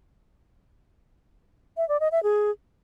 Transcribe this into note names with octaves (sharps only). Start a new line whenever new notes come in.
E5
D5
D#5
E5
G#4